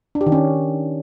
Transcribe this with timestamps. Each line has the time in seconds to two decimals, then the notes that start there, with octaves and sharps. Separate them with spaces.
0.15 D4
0.21 G4
0.26 D#3
0.32 C#4